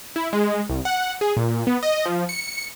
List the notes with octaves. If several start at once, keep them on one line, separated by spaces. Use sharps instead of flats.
E4
G#3
C2
F#5
G#4
A#2
B3
D#5
F3
C#7